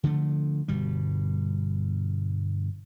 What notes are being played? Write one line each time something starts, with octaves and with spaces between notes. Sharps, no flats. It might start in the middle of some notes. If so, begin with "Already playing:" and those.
D3 F3 A3
G1 B2 G3